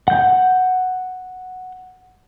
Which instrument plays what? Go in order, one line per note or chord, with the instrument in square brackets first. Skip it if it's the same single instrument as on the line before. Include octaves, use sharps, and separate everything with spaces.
[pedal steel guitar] F#5 G6